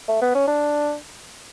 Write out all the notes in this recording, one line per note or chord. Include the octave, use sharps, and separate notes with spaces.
A3
B3
C#4
D4